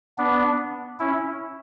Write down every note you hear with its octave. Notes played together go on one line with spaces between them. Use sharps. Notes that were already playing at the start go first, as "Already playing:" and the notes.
B3 D4
C#4 E4